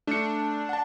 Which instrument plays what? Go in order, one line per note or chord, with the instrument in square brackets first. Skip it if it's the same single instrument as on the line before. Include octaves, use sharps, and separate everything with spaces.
[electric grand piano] A3 C#7 [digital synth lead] D4
[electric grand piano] F#5 A5